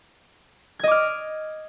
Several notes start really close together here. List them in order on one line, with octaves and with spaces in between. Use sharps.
G#6 D#5 D6 F6